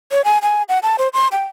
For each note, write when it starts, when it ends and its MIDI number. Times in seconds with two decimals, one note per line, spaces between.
0.12 0.21 73
0.25 0.38 80
0.42 0.63 80
0.69 0.79 78
0.83 0.96 81
0.99 1.08 72
1.13 1.28 84
1.32 1.44 79